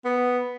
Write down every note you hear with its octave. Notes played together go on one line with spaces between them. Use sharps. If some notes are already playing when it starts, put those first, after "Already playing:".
B3